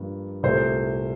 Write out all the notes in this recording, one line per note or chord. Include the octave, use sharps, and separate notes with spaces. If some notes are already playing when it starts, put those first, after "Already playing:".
Already playing: G2 F3 A#3
C2 A#2 A3 C5